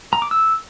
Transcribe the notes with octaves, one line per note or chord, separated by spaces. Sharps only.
A#5
D6
E6